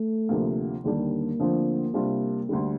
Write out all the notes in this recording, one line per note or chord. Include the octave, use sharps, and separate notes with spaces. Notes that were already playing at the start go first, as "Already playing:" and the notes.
Already playing: A3
D2 C3 F3 A#3
D#2 D3 G3 A#3 D4 G4
D2 D3 F3 C4
C3 G3 D4 F4
D2 D3 G3